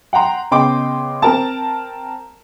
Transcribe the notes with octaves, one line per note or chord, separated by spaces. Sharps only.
F#5 G5 A#5 C6
C#3 B3 D#5 G5 C6 D6
C4 A#4 A5